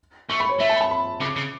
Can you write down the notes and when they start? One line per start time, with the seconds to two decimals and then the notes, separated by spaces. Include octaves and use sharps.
0.29 A3 C#6
0.40 B5
0.49 C#5
0.59 A3 E5
0.70 A5
0.76 B5
0.81 A5
0.91 B5
1.20 C#3 D6
1.36 C#3